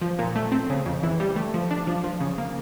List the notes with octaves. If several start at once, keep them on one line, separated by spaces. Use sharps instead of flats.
F3
A#2
A3
C4
C#3
F2
E3
G3
A3
F3
D4
F3
F3
C#3
A#3